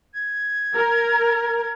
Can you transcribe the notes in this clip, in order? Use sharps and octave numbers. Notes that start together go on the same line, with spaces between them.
G#6
A#4